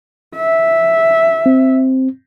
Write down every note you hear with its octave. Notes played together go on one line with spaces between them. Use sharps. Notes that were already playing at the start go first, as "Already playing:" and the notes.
E5
C4